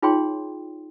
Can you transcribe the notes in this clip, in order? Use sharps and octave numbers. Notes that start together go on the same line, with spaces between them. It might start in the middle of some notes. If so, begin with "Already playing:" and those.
D#4 F4 G#4 C#5 G5 C6